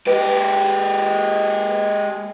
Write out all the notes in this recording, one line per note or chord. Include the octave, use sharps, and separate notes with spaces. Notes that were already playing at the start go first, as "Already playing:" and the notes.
G#3 G4 B4